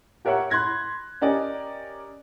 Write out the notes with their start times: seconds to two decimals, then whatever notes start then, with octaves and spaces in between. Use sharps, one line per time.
0.25 G4 A#4 C#5 E5 F#5
0.50 B5 C6 F#6 G#6 A#6
1.21 C#4 G4 A#4 D5 D#5